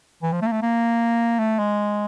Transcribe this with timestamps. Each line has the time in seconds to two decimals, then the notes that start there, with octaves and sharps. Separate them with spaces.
0.23 E3
0.32 F3
0.42 A3
0.47 A#3
0.52 A3
0.62 A#3
1.39 A3
1.59 G#3